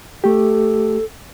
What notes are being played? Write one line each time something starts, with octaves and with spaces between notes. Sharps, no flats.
A3 G4 A4